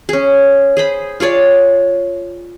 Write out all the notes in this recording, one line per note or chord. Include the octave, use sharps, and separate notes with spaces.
C#4 G#4
G#4 C5 B5
F4 G#4 C#5 D5